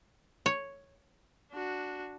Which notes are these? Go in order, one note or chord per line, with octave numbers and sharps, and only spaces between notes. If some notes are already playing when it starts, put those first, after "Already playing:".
C#5
D4 F#4